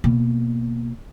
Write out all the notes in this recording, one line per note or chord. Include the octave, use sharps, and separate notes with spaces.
B2 A#3